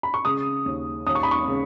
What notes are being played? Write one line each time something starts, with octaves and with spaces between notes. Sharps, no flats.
B5
C#6
C#3 D#6
D#2
D#2 D#6
C#6
B5
C#6
C#3